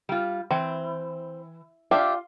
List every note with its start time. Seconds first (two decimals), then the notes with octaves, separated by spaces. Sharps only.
0.09 G3 F4
0.51 E3 C4
1.91 D4 F4 G4 E5 F5